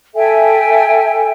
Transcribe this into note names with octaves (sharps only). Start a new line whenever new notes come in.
A4 E5 G5 G#5